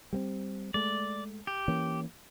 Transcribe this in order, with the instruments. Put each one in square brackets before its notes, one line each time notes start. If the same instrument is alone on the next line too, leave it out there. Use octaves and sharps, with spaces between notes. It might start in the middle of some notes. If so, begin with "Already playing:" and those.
[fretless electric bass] G3 B3 C4
[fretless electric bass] G#3 A3 [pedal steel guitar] D5
[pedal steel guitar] G4
[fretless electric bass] E3 A#3 C#4